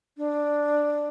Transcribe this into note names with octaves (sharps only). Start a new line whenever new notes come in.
D4